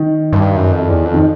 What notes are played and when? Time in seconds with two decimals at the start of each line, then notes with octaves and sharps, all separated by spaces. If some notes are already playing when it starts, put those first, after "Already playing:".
Already playing: D#3
0.33 G2
0.56 F#2
0.72 F2
0.89 E2
1.06 F2
1.14 D#3